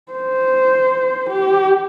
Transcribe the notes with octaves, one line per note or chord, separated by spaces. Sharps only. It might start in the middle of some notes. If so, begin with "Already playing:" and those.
C5
G4